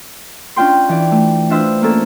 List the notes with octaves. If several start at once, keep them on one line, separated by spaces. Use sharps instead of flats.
C#4 D4 F4 G5 C6
E3 D5
A3
D4 F4 B4 C5 E5
A#3 C#4 A4